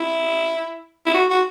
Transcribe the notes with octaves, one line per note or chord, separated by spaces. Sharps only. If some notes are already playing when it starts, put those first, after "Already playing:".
Already playing: E4
E4
F#4
F#4